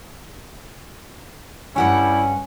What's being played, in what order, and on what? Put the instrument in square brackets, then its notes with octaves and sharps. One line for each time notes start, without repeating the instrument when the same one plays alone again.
[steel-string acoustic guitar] G2 F#5 G5 [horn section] G3 E4 [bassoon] C#4